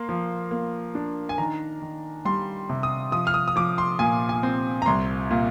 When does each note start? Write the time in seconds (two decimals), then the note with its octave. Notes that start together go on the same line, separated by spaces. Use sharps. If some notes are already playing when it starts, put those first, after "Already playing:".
Already playing: A#3 C6
0.09 F3
0.51 A#3
0.95 D4
1.29 G#5
1.38 D#3 A#5
1.82 D#3
2.25 G3 C6
2.69 C3
2.83 D#6
3.12 F3 D#6
3.27 F6
3.34 D#6
3.48 D#6
3.56 F3 D6
3.78 C6
3.99 A#2 G#5
4.29 G#5
4.43 C4
4.82 A#5
4.86 C2 C6
5.31 A#2